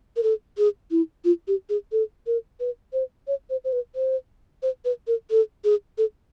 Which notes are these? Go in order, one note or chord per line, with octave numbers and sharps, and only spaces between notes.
A#4
A4
G#4
E4
F4
G4
G#4
A4
A#4
B4
C5
C#5
C5
C5
B4
C5
C5
B4
A#4
A4
G#4
A4